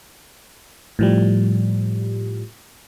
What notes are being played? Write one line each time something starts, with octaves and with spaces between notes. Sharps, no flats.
A2 F3 G3